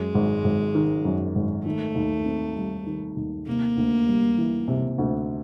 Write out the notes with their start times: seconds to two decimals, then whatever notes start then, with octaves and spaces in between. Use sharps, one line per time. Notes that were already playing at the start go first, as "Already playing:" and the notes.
Already playing: F#2 G#3
0.15 G#1
0.44 G#1
0.75 D#3
1.05 F#2
1.35 G#1
1.65 D#3 A3
1.95 D#2
2.25 C4
2.57 G3
2.86 D#3
3.16 D#2
3.47 C3 A#3
3.77 D2
4.07 G3
4.38 E3
4.68 C3
4.98 D2